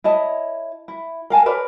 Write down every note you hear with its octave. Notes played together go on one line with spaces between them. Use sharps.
E4 C#5 D#5 A5
E4
A#4 F5 G#5 A5
A#4 B4 C#5 D5